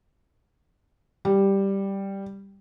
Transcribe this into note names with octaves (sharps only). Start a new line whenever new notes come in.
G3